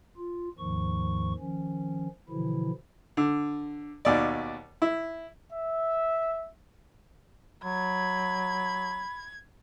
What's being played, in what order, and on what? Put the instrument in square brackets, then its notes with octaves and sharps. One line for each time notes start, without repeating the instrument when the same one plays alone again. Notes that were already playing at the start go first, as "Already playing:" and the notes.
[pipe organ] F4
D#2 G#2 D#3 F3 C#6
D#3 F3 C#4
B2 D3 E3 F3 E4
[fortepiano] D3
D#2 B2 D5
E4
[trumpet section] E5
[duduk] F#3 [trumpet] B5 [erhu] G#6